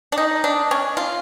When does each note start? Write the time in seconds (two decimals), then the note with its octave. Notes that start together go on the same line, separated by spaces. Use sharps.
0.12 D4
0.18 D#4
0.44 D4
0.71 C#4
0.97 F4